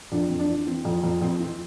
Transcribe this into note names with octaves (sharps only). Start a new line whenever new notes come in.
F2 D4
F2 C4
D4
E3
E3 C4
F2
F2
F2 C4
E3